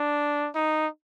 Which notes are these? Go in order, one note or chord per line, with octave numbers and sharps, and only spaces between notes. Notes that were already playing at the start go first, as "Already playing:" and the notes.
Already playing: D4
D#4